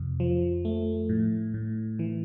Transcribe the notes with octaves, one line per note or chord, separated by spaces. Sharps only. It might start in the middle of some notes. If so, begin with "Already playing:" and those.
Already playing: F2 C3
F3
A3
A2
A2
E3